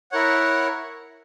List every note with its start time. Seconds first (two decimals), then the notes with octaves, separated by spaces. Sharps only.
0.12 E4 A#4 C#5 F#5